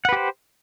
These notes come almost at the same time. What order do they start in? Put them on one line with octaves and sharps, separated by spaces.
F#5 B4 G4 C5